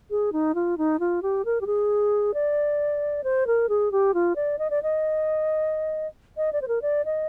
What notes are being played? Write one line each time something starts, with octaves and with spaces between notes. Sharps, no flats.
G#4
D#4
F4
D#4
F4
G4
A#4
G4
G#4
D5
C5
A#4
G#4
G4
F4
D5
D#5
D5
D#5
D#5
D5
C5
A#4
D5
D#5